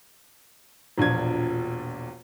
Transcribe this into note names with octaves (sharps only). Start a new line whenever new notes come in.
E1 A#1 A#2 G#6